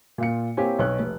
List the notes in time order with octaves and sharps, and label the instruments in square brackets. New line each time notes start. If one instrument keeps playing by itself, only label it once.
[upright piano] A#2 F4 C#7
A#3 C4 E4 G4 C#5 G#5
B1 B2 C#5 F#6
F1